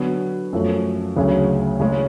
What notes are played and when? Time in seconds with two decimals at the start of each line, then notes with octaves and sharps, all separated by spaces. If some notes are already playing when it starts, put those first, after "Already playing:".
Already playing: D3 F#3 B3 F#4
0.53 F#2 F3 A3
1.16 D2 C#3 F#3 C#4 G#4
1.80 C#3 G#3 C#4